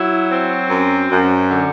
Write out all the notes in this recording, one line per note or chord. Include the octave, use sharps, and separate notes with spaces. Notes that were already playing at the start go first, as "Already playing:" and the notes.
Already playing: F#3 E4
C4
F#2
F#2
D3